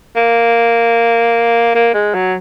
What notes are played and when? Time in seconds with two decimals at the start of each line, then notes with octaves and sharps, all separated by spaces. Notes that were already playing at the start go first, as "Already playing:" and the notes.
0.16 A#3
1.75 A#3
1.94 G#3
2.14 F#3